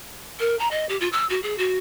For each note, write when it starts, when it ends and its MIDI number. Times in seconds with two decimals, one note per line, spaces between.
0.39 0.55 70
0.59 0.70 82
0.70 0.85 75
0.89 0.96 67
1.00 1.08 65
1.12 1.25 88
1.29 1.39 66
1.42 1.58 68
1.58 1.78 66